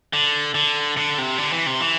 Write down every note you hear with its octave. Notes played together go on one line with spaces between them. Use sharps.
D3
D3
D3
C3
D3
E3
C3
E3